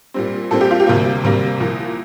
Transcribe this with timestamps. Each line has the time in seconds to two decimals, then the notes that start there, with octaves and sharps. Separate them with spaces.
0.14 A#2 G3 C4
0.51 A#2 G3 C4 A4
0.61 G4
0.71 F4
0.80 G4
0.87 D2 C3 G3 A#3
1.23 D2 C3 G3 A#3
1.60 C2 A#2 F3 A#3